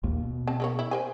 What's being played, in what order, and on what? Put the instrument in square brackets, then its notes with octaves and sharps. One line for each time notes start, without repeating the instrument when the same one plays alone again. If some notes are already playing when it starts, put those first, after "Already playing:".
[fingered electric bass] A#1 D#2 A#3
B2
[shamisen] C4 A5
C#3 A#3 C#5
E4
A#4 C5 G#5